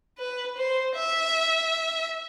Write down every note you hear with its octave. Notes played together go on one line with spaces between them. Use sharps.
B4
C5
E5